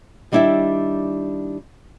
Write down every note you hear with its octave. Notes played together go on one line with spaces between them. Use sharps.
D#3 G3 D4 E4 G4 E5